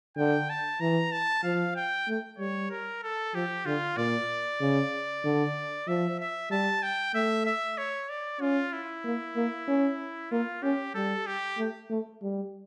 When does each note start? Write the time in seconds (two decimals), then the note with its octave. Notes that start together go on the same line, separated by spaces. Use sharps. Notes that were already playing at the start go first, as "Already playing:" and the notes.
0.17 D3 G5
0.49 A5
0.81 E3 A#5
1.12 A5
1.44 F3 F5
1.76 G5
2.08 A3
2.38 G3 C#5
2.71 A#4
3.03 A4
3.35 F3 G4
3.66 D3 F4
3.97 A#2 D5
4.61 C#3
5.25 D3
5.88 F3 E5
6.20 E5
6.51 G3 A5
6.83 G5
7.14 A3 E5
7.46 E5
7.78 C#5
8.09 D5
8.41 C#4 F4
8.73 E4
9.05 A#3
9.36 A#3
9.68 C#4
10.32 A#3 F4
10.63 C#4 G4
10.94 G3 A4
11.27 G4
11.58 A3
11.90 A3
12.22 G3